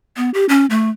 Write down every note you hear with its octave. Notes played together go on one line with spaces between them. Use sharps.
B3
G4
C#4
A3